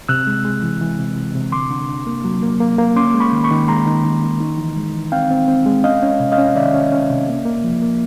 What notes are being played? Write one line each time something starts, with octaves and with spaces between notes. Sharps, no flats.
C3 E6 F#6
G#3
G#3
E3
E3
C3
C3
C3
D3 C6 D6
D3
D3
A#3
F#3
A#3
A#3
A#3
C#4 C6 D6
G#3
B5 C#6
D#3
B5 C#6
D#3
G#3 A#5 C6
D#3
D#3
D#3
D#4
E3
G#3
E3
C4 F5 G5
C4
C4
G#3
C#4 D#5 F5
C#4
C3
D#5 F5
C#4
D#3 D5 E5
C#4
C#4
C3
A#3
A#3
F3
A#3